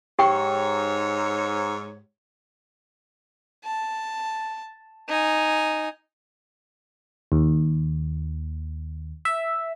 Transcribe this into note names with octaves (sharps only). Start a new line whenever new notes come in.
G#2 G4 C#5 G5 C#6
A5
D#4 G#5
D#2
E5